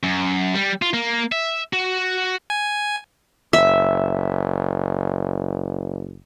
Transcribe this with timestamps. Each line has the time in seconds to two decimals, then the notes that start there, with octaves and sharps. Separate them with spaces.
0.03 F#2
0.54 G3
0.82 F4
0.94 A#3
1.32 E5
1.73 F#4
2.50 G#5
3.53 F#1 E5